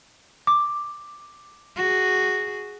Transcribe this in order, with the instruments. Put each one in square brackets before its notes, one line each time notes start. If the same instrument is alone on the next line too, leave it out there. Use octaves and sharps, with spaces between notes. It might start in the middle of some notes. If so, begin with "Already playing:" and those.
[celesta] D6
[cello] F#4 G#4